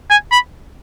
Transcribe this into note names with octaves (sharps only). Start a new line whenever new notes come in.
G#5
B5